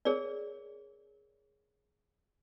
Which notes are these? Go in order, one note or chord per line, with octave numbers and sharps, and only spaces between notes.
G#4 A#4 C#5 D5